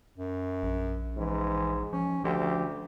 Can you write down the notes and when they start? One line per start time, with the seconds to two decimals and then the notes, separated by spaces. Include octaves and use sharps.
0.16 F#2
0.63 A#1
1.17 G#2 E3
1.93 F3 C#4
2.24 D2 F3 G4